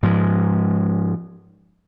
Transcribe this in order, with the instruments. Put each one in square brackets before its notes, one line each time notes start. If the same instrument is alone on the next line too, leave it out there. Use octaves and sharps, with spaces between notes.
[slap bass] G#2 F3 G#3